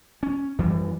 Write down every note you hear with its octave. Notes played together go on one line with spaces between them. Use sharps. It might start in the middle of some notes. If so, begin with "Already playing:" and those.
C#4
F#2 E3 G3